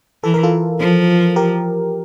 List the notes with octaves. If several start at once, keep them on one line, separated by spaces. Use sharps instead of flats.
E3 A4
A#4
F4 A4
F3
G4 A#4